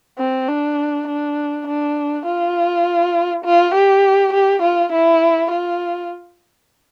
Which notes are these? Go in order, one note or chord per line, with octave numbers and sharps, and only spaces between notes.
C4
D4
D4
D4
F4
F4
G4
G4
F4
E4
F4